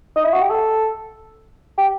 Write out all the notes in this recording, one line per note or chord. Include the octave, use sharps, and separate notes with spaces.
D#4
E4
F#4
G4
A4
G4